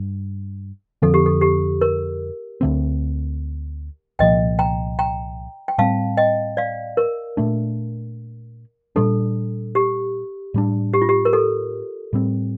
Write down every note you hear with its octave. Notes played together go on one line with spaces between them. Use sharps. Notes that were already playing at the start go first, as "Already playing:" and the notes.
Already playing: G2
F2 D3 F3 C4 A4
G4
A4
G4
A#4
D2 D3 A3 C4
C2 A#2 F3 A#3 D#5 G5
G5 A#5
G5 A#5
G5
A2 G3 C4 F5 A5
D#5 G5
D5 F5
A#4
A#2 A3 D4
A#2 G3 D4 A4
G4
A2 G3 D4
G4
F4
G4
A#4
A4
A2 G3 C4